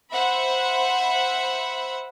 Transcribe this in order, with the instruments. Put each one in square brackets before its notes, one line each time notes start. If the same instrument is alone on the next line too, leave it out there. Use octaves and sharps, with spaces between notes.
[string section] C5 E5 F#5 B5